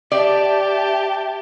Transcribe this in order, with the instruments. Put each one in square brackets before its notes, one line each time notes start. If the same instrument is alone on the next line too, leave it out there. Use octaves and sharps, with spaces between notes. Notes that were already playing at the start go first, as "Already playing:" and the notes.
[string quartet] G4 A5 [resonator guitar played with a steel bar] D5 [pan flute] E5